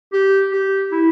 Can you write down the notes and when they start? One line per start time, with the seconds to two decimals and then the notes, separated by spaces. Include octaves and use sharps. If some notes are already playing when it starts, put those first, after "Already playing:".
0.13 G4
0.52 G4
0.92 E4